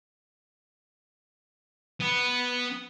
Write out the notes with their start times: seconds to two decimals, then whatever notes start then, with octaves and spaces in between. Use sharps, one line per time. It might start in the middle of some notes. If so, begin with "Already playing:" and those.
2.00 B3